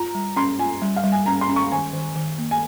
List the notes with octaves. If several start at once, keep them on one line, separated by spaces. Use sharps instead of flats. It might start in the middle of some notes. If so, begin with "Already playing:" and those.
Already playing: F4 A#5
G3
C#4 C6
F4 G#5
G3
F5
G3
G#5
C#4 A#5
C6
C#4
C#6
D#3 G#5
D#3
D#3
A#3
G#5